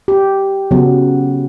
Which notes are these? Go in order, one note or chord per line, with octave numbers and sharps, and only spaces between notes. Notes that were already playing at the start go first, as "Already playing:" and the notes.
G4
C#3 F#3 B3